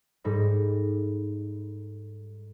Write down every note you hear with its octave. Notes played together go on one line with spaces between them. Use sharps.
G#2 G3 D#4 A4 B5 A#6